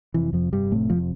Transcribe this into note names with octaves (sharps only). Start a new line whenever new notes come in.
F1 F2 C3 E3
F2 F3
G2 G3
F1 F2 A2 C3 A3
F2 F3